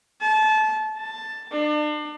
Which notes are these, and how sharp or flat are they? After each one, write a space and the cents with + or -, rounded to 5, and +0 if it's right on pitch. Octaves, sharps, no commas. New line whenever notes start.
A5 -25
A5 +10
D4 +35